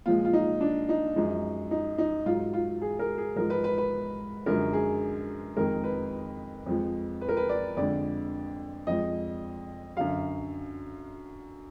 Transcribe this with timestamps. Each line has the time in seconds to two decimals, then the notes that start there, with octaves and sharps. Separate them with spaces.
0.06 A#2 F3 G#3 F4
0.25 F4
0.33 D#4
0.61 D4
0.89 D#4
1.16 F#2 F3 G#3 D#4
1.71 D#4
1.98 D#4
2.26 G#2 F#3 F4
2.54 F4
2.82 G#4
2.99 A#4
3.18 G#4
3.36 G#2 F3 G#3 A#4
3.50 B4
3.64 B4
3.78 B4
4.46 F#2 D3 F3 G#3 A#4
4.73 G#4
5.57 F2 D#3 G#3 A#4
5.84 B4
6.66 F2 F3 G#3
7.21 B4
7.29 A#4
7.37 B4
7.49 D5
7.76 F2 D3 G#3 D5
8.87 F2 F3 G#3 D#5
9.96 F#2 D3 F#3 F5